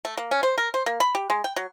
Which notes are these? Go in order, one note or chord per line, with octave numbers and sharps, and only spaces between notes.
A3
A#3
C#4
C5
A#4
C5
A#3
B5
G4
G#3
G5
F#3